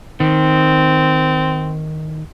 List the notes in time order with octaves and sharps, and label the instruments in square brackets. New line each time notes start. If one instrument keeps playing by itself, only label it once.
[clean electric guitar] D#3 [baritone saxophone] C4